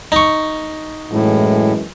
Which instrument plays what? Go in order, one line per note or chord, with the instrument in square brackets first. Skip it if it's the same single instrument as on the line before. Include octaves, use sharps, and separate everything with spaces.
[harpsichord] D#4 C#6
[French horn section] F#2 E3 G#3 [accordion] A2